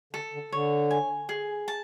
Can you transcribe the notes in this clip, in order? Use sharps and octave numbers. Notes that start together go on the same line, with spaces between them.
D3 A4
D3
D3 C#5
G#5
G#4
A5